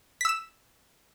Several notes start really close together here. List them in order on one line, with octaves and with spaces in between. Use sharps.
B6 E6 E7